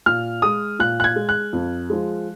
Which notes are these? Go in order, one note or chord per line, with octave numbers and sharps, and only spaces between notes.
A#2 F6
G#3 D#6
A#2 F#6
F#6
G#6
G#3
F#6
F2
F3 G#3